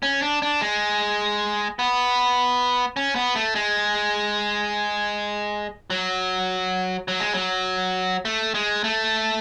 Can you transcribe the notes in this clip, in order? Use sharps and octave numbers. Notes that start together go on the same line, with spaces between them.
C#4
D4
D4
G#3
B3
C#4
B3
A3
G#3
F#3
F#3
G#3
F#3
A3
G#3
A3